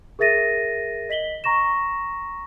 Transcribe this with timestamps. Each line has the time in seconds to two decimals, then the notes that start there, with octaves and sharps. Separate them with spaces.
0.19 G#4 A#4 E5 A6 A#6 D#7
1.09 D#5 B6 F#7 G7
1.44 A#5 C#6 A#6 E7